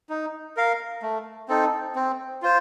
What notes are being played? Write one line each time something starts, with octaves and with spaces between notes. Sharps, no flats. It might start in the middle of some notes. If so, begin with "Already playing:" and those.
D#4
A#4 F5
A3
C4 D#4 A4
C4
F4 C5